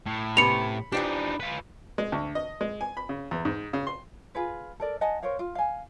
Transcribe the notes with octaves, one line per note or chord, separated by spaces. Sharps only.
A2
C3 B3 C#4 B5 C#7 F7
E3 F3 D4 D#4 G4
F4 B4
G#3
D2
D#5
G#3
G#5
B5
C#3
E2
G#2
C#3
C6
F4 G#4 B4
A4 A#4 D5
D#5 F#5 G#5 A5
A#4 C5 C#5 F5
F4
F5 G#5